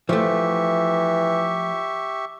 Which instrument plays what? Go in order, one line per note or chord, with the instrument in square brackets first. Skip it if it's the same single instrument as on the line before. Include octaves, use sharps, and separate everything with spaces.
[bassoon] E3 [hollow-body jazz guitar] F3 A3 [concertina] G4 E5 C#6